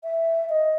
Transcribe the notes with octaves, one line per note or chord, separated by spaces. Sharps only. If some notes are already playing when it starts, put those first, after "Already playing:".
E5
D#5